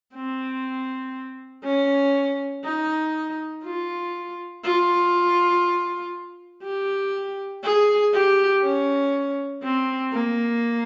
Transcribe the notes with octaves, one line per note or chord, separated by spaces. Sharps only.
C4
C#4
D#4
F4
F4
G4
G#4
G4
C#4
C4
A#3